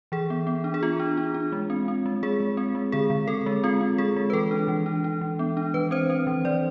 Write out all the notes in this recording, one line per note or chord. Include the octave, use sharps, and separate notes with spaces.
E3 G#4
B3
B3
D4
G#4
B3 F4
D4
D4
D4
G#3
C4
C4
G#3
G#3 G#4
G#3
C4
G#3
D3 G#4
D3
C4 A4
G#3
C4 F4
C4
G#3 G#4
G#3
B4
E3 A4
D4
E3
D4
D4
E3
B3
D4
E3 B4
C4 C5
C4
E3
E3 D5